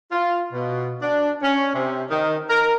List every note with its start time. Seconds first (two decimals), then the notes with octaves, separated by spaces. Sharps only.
0.11 F4
0.52 B2
1.01 D4
1.42 C#4
1.73 C3
2.09 D#3
2.48 A#4